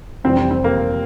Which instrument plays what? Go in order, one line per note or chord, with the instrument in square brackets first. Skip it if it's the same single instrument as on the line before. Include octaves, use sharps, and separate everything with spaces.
[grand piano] F1 F2 E3 G3 [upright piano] C4
[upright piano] C4
C4
A#3